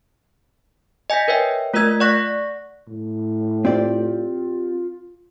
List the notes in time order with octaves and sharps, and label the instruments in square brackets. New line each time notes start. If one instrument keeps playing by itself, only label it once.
[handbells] D#5 G#5 G6 A#6 B6
A#4 B4 C#5 E5 G5
A3 F4 A#4 D#5 E6 G#6
D5 F#5 C#6 F#6 A#6 B6
[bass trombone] A2
[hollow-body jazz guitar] C4 G4 D5 [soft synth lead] F4